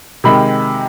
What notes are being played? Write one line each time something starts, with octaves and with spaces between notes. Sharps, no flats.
C3 D#3 G#3 B5